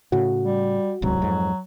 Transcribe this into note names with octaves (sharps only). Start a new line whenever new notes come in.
A2 C#3 F#4
G3
D1 C2 G#2 F#3
F2 G#2